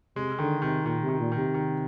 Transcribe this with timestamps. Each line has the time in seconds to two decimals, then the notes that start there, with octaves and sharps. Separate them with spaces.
0.15 C3 G#3
0.39 D3 D#3
0.62 C3 D#3
0.85 A#2 D#3
1.03 C3
1.09 D#3
1.20 A#2
1.32 D#3
1.37 C3
1.54 D#3